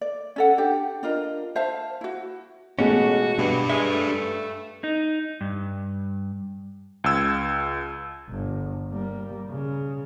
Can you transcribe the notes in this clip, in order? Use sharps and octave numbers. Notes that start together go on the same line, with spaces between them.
D5
C#4 A4 F#5
D4 G4
D4 F4 A#4 D#5
C5 E5 F5 A5
E4 F#4
A1 B2 G#3 C#4 F4 F#4 A4
G2 B2 D4 B4
G#3 E5
A3
D#4
G2
C#2 E6 G#6
G1
G3 A#3
C#3